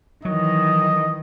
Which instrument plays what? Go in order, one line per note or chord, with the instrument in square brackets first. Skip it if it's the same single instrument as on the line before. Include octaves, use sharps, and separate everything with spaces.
[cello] D#3 E3 [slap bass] F#3 [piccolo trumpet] D#5